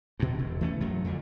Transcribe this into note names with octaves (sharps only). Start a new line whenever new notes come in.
G2 B2
E1
E3 A3 C#4
F#2 F#3 A3
F2 D3